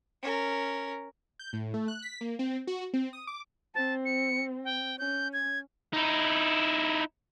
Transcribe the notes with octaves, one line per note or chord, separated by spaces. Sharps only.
C#4 A#4
G6
A2
A3
F#6
B6
A#3
C4
F#4
C4
D#6
D6
C4 A5
C#7
G5
C#4 G6
G#6
D#4 E4